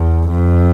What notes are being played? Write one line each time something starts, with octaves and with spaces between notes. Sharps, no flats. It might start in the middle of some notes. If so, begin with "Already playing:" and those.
Already playing: E2
F2